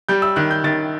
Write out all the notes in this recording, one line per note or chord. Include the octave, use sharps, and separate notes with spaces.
G3 G6
E6
D#3 F#6
G6
D#3 A6